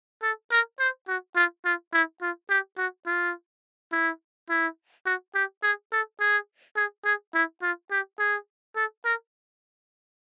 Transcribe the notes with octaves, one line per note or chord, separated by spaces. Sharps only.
A4
A#4
C5
F#4
F4
F4
E4
F4
G4
F#4
F4
E4
E4
F#4
G4
G#4
A4
G#4
G#4
G#4
E4
F4
G4
G#4
A4
A#4